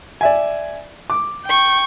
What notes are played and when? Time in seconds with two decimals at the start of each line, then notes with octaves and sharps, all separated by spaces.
0.21 D5 E5 G#5
1.10 D6
1.45 G5 C#6